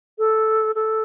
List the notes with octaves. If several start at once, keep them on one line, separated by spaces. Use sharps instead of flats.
A4
A4